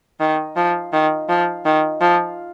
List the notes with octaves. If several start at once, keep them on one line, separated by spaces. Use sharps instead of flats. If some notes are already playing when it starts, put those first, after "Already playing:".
D#3
F3
D#3
F3
D#3
F3